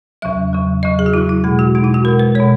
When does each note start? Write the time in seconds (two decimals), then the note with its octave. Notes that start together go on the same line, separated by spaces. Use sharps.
0.22 E2 C#3 F#3 E5
0.53 E2 C#3 F#3
0.83 E2 C#3 F#3 D#5
0.99 G#4
1.06 F#4
1.14 E2 C#3 F#3 E4
1.29 E4
1.44 B2 G#3 G#4
1.59 F#4
1.75 B2 G#3 D#4
1.84 E4
1.94 F#4
2.04 B2 A#4
2.08 G#3
2.19 B4
2.35 G#3 C#5
2.40 B2